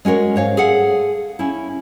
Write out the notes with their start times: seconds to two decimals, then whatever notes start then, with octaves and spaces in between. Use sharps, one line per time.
0.05 G#3 C#4 F#4 A#4 C#5
0.36 G#2 C#5 F5
0.57 G#4 A4 F5 F#5
1.39 C#4 E4